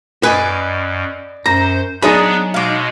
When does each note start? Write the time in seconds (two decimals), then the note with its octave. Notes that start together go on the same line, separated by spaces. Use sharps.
0.23 F#2 B4 D5 D#5 G#5
1.46 F#2 C5 A#5
2.02 F#3 B3 D4 D#4 G#4 D5 B5
2.54 B2 G#3 F5 D6